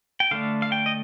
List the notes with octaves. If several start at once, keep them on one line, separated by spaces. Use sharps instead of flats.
G5
D3 A3 D4 F5
F5
G5
D#5